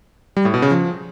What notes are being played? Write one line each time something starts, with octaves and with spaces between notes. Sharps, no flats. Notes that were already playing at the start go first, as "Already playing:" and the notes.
G3
A2
B2
C#3
F3